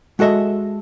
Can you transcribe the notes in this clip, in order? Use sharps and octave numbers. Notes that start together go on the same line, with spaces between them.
G#3 F#4 A4 D#5 E5